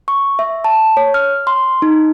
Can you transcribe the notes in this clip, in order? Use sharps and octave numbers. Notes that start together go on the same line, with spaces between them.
C#6
E5
A5
C#5
F6
C6
D#4